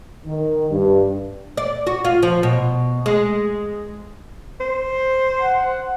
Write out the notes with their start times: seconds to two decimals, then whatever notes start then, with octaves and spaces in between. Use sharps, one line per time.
0.24 D#3
0.71 G2
1.57 D5
1.87 F#4
2.05 F4
2.23 F3
2.43 B2
3.06 G#3
4.61 C5
5.41 F#5